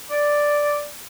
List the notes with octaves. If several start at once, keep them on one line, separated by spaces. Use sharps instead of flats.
D5